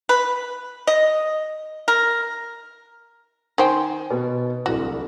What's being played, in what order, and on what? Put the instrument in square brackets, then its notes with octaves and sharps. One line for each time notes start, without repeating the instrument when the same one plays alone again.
[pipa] B4
D#5
A#4
[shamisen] D#3 C5 G5 [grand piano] G#5
[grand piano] B2 B3
[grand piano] D1 C2 [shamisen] F#4